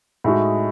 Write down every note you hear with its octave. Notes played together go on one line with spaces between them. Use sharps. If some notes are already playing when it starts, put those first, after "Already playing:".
A2 G#3 D#4 F#4